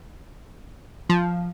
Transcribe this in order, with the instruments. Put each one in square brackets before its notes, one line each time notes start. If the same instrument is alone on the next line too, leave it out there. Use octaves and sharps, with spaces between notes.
[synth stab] F3